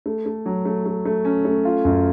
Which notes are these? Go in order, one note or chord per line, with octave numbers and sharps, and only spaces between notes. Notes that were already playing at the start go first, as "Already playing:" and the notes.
A3
A3
F#3
A3
A3
A3
C#4
A3
F4
F#2